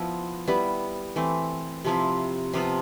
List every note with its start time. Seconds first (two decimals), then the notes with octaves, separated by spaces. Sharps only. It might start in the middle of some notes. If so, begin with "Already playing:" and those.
Already playing: F3 B3 E4
0.47 G3 B3 E4 B4
1.16 E3 A3 C4
1.84 C3 F3 C4 E4
2.53 C3 F3 B3 F4